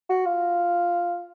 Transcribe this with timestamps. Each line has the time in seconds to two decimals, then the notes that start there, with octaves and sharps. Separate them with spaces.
0.09 F#4
0.26 F4